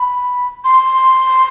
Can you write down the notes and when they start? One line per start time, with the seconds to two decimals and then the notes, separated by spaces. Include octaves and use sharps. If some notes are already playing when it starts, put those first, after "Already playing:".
Already playing: B5
0.64 C6